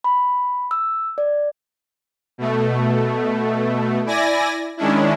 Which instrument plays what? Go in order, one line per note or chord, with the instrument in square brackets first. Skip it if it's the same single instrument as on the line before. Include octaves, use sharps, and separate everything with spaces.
[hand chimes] B5
E6
D5
[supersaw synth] B2 A3
E4 D5 G#5 A#6
D#3 G#3 C#4 D4 E4